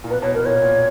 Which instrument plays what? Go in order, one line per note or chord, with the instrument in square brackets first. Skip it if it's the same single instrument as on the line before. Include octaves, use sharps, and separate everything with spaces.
[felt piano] A#2
[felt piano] B2 [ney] B4
[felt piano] B2 [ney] C#5
[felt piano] B2 [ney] A#4
[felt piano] A#2 [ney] C#5
[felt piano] A#2